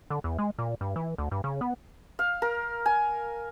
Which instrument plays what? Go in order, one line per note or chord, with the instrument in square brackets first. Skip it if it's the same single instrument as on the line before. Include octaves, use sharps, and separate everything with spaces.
[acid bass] D3
E2
G#3
A#2
G2
E3
D2
G2
C#3
B3
[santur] F5
A#4
G#5